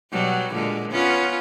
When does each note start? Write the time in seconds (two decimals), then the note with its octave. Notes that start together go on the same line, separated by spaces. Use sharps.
0.12 B2 F#3 G3
0.53 A#2 D3 G#3
0.91 B3 C#4 F4